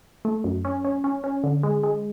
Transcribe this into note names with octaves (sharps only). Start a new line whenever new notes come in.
A3
F#2
C#4
C#4
C#4
C#4
D3
G#3
G#3